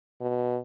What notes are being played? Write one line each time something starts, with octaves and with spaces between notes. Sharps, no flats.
B2